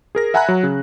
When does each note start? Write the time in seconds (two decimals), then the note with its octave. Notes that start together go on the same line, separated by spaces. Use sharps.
0.15 G#4 A#4 A#6
0.34 E5 F#5 G#5 A#5 B5 F#6
0.48 F#3
0.63 C#3